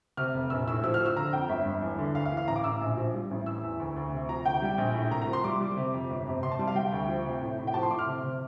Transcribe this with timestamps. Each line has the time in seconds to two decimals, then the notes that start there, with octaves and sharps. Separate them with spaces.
0.17 C3 F6
0.34 F1
0.50 A#1 E6
0.68 A2 E6
0.84 F3 E6
0.94 F6
1.00 F3
1.06 E6
1.16 D3 A#5
1.33 F2 G5
1.49 G1 E5
1.66 G2
1.82 E2
1.98 D3
2.15 D2 F5
2.25 F5
2.32 E3
2.37 F5
2.48 A1 A#5
2.56 D6
2.64 A1 E6
2.81 A#1
2.97 F3
3.14 G3
3.31 A1
3.46 E3 E6
3.63 E2
3.80 D2
3.96 D2
4.12 C3
4.29 F3 A#5
4.45 D2 G5
4.62 G3
4.78 A#1
4.94 A2
5.11 C2 A#5
5.22 A#5
5.27 F3
5.33 C6
5.44 G3 D6
5.61 G3
5.77 C3
5.94 F2
6.10 G1
6.27 C3
6.43 C3 C6
6.52 A5
6.59 G3
6.67 F5
6.75 G3 G5
6.92 D2
7.08 F3
7.25 C3
7.41 A2
7.58 A2
7.67 G5
7.74 F3 A5
7.83 C6
7.91 A2 D6
7.99 F6
8.07 C3
8.24 C3